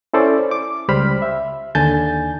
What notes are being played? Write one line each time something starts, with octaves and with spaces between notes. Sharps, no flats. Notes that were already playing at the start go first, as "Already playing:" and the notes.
C#4 E4 A4 C5 D5
D6
C#2 G3 C5 B5 F6
E5
D#2 D3 G#5 A5 G6 A6